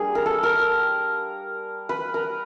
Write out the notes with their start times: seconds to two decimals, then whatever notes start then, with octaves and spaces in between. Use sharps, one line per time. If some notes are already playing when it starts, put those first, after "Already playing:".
Already playing: G3 A#3 D4 G#4
0.15 A#4
0.26 A4
0.43 A#4
1.89 B4
2.14 A#4